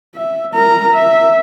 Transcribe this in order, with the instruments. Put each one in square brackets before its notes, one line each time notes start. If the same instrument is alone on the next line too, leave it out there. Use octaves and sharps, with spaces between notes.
[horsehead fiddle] E5
A#4 A#5
E5